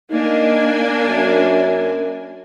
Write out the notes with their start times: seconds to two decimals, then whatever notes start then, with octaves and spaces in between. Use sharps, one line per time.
0.12 A#3 D4 D#4 G#5
1.08 F#2